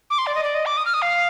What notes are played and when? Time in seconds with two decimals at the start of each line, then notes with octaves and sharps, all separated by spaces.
0.10 D6
0.18 C6
0.27 D5
0.35 D#5
0.44 D5
0.55 D#5
0.66 D6
0.77 D#6
0.86 F6
0.94 D#6
1.02 F5